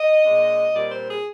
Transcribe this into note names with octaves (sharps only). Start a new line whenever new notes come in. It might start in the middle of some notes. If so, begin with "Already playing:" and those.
Already playing: D#5
A#2 G#3 D4
A#2 G3 C4 D5
C5
G#4